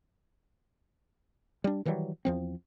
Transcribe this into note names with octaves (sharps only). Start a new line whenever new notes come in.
G3 D4
D#3 E3 F#3 G3
E2 F3 C4